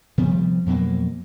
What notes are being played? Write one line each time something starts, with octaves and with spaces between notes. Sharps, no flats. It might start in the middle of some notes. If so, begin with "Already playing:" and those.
C3 F3 G3 B3
F2 B2 F#3 A#3